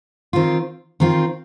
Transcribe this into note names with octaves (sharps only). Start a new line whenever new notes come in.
D#3 C4 F4
D#3 C4 F4